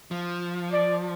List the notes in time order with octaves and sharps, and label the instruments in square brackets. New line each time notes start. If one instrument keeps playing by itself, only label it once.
[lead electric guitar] F3
[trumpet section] D5